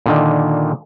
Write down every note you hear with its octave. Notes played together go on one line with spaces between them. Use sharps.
A#2 D3 D#3